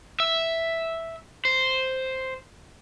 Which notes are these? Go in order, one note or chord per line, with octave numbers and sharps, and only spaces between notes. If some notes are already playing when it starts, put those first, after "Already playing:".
E5
C5